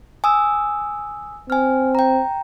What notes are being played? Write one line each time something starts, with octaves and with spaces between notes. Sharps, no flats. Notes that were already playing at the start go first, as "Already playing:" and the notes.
G#5 D#6 E6
C4 G#5 F6
G5 A#5